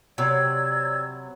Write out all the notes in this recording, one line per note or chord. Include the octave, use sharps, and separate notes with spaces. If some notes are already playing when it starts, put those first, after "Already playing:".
C3 F#3 B4 D5 E6 G#6